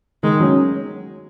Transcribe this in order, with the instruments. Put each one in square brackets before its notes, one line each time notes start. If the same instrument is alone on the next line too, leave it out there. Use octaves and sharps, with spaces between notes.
[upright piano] D#3 [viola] G#3
[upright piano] F#3 C#4